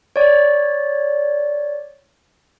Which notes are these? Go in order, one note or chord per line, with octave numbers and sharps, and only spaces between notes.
C#5 D5